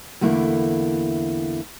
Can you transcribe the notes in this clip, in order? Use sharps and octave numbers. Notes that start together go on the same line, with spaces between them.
E2 D3 A3 A#3 E4